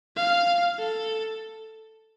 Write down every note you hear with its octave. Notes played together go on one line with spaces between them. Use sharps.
F5
A4